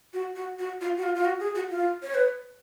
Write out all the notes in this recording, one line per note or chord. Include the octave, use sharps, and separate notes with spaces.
F#4
F#4
F#4
F4
F#4
F4
F4
F#4
G#4
F#4
F4
C#5
B4